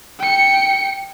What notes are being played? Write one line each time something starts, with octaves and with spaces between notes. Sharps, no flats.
G5 C#7